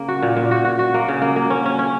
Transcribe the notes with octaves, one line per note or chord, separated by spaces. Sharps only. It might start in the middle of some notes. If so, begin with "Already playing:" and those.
Already playing: C#3 A#3
F#4
A#2
A#2
F#4
F#4
F#4
A#3
C#3
A#3
A#3
C#4
C#4
C#4